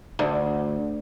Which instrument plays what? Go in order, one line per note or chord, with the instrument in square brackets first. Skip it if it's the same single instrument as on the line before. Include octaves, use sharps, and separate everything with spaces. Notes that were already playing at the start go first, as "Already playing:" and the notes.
[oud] D2